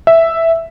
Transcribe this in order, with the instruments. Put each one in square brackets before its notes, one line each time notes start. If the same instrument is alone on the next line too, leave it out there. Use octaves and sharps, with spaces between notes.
[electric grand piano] E5